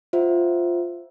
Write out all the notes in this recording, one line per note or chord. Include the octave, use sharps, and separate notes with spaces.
F4 C5 E5 F#5